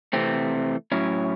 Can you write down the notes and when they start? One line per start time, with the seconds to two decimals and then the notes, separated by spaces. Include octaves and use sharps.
0.13 C3 E3 A3 C4
0.92 A2 F#3 C#4 E4